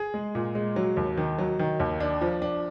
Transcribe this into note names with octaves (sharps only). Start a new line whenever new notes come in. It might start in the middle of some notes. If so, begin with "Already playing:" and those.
Already playing: G#4
G#3
A#2
G#3
F#3
D#2
D#3
F#3
D#3
D#2
D4
F3
D4